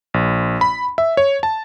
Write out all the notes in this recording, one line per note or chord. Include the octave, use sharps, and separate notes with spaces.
A#1
B5
E5
C#5
A5